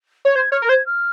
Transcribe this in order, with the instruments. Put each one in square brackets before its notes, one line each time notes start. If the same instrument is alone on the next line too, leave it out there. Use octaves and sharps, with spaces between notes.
[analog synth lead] C#5
[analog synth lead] C5 [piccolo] G#6
[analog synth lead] C#5 [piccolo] F6
[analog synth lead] A#4
[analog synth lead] C5 [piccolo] G#6
[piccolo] F6